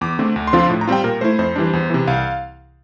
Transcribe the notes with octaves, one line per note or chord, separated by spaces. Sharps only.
E2 D6
D3 A3 C4
D2
C6
D3 F3 C4 F4
C6
A2
A#5
G3 C4 F4 G5
A#2 A#4
A3 E4 C5
F2 C5
E3 G3 D4
E2
C3 E3
C2 F5